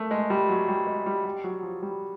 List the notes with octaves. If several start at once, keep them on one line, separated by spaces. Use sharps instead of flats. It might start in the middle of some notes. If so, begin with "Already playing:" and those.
Already playing: A3 A#3
G#3
G3
F#3
G3
G#3
G3
G3
F#3
F3
G3